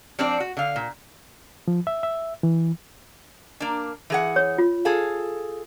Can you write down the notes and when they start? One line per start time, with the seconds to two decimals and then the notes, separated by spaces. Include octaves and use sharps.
0.19 F3 C4 D4 C5 D5
0.40 F#4
0.57 D3 F5
0.76 A#2
1.68 F3
1.87 E5
2.03 E5
2.43 E3
3.60 A#3 D4
4.10 E3 G#4 F#5
4.36 C#5
4.58 F4
4.85 G#4 A4 F5